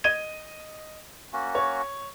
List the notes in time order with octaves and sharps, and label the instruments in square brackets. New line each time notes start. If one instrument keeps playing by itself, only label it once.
[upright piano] D#5 D#7 G7 [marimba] G#6
[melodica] A#3 C#4 F#4
[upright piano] C#5